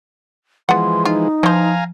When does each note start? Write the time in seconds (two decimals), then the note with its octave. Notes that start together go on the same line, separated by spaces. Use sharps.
0.69 E3 F3 G#3 B3 F#5 C6
1.05 D#4 F4
1.43 E3 F3 C5 F5 G#5 A#5